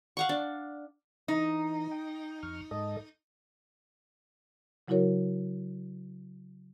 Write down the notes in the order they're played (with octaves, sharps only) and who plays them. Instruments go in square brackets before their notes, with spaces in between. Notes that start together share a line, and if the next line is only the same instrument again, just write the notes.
[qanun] F5 F#5 C#6
D4
[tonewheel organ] E3 [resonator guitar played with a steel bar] D#4
[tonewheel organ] G5
F2 C#6 F6
G#2 A4 D#5
[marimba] C#3 F#3 E4 F#4 A#4 C#5